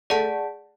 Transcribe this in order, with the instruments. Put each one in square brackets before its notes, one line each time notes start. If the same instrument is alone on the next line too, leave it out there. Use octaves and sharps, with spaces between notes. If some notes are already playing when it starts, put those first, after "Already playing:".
[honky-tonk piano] A3 [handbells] G#4 D5 F#5 A5